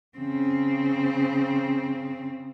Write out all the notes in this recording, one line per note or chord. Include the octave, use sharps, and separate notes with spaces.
C#3 C4